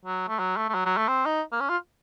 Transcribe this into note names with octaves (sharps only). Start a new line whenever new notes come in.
F#3
A3
F#3
A3
A3
F#3
F#3
A3
C4
D#4
A#3
C#4
F4